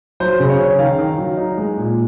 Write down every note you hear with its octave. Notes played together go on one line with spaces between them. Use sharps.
F#3 C5
C#3
C#5
C#4
D#3 F5
D#3
F#3
D#4
G#3
A#2